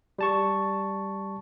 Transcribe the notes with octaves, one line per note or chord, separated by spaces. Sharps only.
G3 A5 C#6